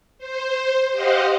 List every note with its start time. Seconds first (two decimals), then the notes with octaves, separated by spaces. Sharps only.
0.18 C5
0.92 G4 C5 D#5 F5 F#5